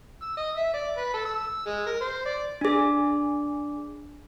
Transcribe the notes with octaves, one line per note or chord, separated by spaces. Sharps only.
E6
D#5
E5
D5
B4
A4
E6
G#3
A#4
C5
D5
D4 G#4